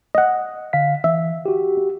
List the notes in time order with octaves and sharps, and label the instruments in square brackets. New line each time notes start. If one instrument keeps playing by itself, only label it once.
[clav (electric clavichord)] D#5 F#5
[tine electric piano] D3 F5 B6
[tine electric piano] E3 [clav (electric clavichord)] E5
[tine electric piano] F#4 G4